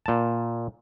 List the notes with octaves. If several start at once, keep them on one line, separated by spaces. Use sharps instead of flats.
A#2 A5